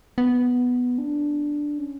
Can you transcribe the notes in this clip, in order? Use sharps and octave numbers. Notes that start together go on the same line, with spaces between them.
B3
D4
C#4